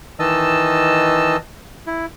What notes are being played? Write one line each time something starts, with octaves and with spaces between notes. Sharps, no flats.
D#3 E3 D#5 A5 E6
E4